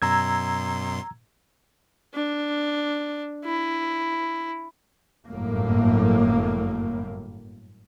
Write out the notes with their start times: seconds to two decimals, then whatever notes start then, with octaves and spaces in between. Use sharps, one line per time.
0.02 F#2 B2 A#5 C6 E6 G#6
2.14 D4
3.45 E4
5.30 G1 F#2 A2 A#3